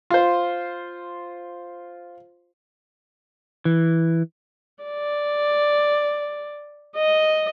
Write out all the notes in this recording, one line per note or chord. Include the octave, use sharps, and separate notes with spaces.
F4 C5
E3
D5
D#5